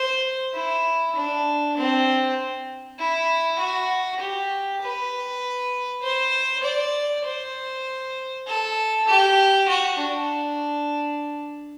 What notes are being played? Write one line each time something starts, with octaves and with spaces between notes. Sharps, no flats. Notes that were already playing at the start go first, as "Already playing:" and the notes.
Already playing: C5
E4
D4
C4
E4
F#4
G4
B4
C5
D5
C5
A4
G4
F#4
D4